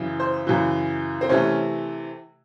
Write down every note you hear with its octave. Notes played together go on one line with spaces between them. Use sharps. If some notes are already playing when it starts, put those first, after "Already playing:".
Already playing: F#2 C#3 E3
C5
F#2 C#3 E3
C4
C3 E3 A3 C#4